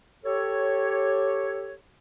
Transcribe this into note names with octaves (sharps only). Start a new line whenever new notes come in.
G4 A4 C#5